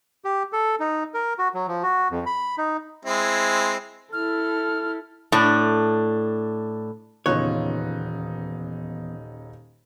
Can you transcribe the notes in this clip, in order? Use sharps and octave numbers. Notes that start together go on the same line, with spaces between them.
G4
A4
D#4
A#4
F#4
F#3
F3
F#4
F2
B5
D#4
G#3 C4 E4
E4 A4 F6
A2 D4
D#1 E2 C#3 B3 D#4 F4 C#5 F#6